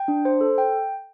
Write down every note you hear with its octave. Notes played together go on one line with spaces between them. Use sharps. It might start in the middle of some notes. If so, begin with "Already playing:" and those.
Already playing: G5
D4
C5
A4
G5